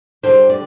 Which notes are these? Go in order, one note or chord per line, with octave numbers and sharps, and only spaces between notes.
D3 G3 D4 C5
D5